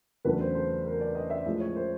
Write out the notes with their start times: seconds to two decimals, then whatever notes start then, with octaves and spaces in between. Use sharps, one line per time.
0.25 E2 C#3 F#3 A3 D4 B4
0.41 C5
0.55 C5
0.86 A#4
1.01 D5
1.15 D#5
1.30 E5
1.46 A2 F3 G#3
1.60 C#5
1.76 C5